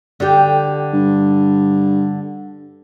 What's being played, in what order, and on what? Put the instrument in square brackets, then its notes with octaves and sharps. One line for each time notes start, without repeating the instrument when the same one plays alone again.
[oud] D3 G4
[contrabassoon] G2